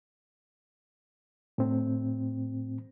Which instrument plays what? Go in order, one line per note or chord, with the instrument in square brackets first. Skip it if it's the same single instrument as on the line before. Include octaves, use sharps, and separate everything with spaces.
[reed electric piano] A2 C4